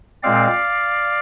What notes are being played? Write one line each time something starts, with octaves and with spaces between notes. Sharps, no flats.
A#2 G#3 C4 D5 F5